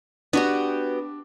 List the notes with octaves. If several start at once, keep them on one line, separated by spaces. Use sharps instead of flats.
B3 D4 F#4 G4